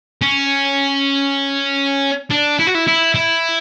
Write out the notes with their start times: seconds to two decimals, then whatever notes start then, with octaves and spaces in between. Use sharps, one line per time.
0.22 C#4
2.31 D4
2.59 E4
2.67 F#4
2.74 E4
2.87 E4
3.15 E4